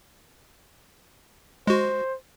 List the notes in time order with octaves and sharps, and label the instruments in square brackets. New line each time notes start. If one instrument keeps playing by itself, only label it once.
[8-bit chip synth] G#3 F#4 [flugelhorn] C5